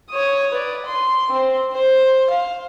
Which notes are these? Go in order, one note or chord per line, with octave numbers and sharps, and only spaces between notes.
C#5 D#6
B4 D5
C6
C4
C5
F5